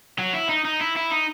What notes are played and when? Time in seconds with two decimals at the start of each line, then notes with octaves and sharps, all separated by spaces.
0.19 F#3
0.33 E4
0.49 D#4
0.65 D#4
0.81 E4
0.96 E4
1.11 D#4